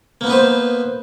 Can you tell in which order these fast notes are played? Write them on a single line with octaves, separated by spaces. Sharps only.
A#3 B3 D#4 B4 C5